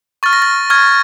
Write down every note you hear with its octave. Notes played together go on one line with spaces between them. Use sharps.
C#6 F6 A6
A#6
A6
C#6 F6 G#6